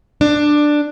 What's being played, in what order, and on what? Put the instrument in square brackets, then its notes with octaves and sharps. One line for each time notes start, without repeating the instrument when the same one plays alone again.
[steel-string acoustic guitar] D4